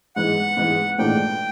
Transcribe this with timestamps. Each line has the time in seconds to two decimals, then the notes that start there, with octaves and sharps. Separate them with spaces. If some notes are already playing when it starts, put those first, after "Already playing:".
0.16 G#2 E3 G#3 F#5
0.57 G#2 E3 G#3
0.98 A#1 G#2 E3 A3 D4 G5